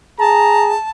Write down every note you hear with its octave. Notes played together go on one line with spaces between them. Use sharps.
G#4 A5 A#5